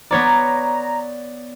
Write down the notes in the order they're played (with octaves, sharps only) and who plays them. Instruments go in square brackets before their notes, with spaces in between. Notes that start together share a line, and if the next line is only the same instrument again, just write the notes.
[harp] B3 C#5 D5 [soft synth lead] A#5